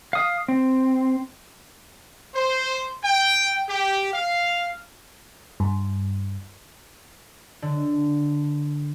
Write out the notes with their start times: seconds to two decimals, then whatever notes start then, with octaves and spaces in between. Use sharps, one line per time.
0.13 F5 D#6
0.48 C4
2.35 C5
3.04 G5
3.69 G4
4.13 F5
5.60 G2
7.62 D3